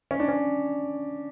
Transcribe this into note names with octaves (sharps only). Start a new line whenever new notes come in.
C#4
D4
C#4